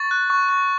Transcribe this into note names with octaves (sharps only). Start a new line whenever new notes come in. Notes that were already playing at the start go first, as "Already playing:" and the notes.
Already playing: C#6 A6
F#6
C#6
C#6